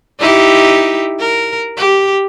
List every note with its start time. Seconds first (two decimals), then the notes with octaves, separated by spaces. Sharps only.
0.19 D#4 E4 G4
1.20 A#4
1.77 G4